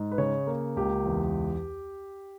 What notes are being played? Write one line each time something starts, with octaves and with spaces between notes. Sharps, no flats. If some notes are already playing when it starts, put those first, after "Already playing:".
Already playing: G#2
B4
C#3 C#5
A#3
C#2 G4
E2